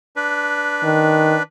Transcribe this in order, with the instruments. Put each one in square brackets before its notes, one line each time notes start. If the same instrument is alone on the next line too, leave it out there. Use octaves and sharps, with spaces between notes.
[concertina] D4 B4
[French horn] D#3